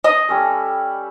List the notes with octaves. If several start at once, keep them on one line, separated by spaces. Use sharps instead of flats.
D#5
G3 C#4 A4